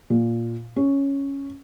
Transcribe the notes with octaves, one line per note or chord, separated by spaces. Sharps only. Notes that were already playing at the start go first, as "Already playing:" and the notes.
A#2
C#4